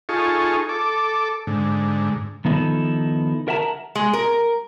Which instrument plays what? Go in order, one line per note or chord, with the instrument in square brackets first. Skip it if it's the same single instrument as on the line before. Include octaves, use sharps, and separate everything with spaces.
[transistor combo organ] D#4 F4 G#4 A4 C#6
A4 D6
G#2 D3
[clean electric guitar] D#3 F3 B3 D#4 E4 A4
A#4 E5 F#5 A5 A#5
[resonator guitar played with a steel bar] G#3
A#4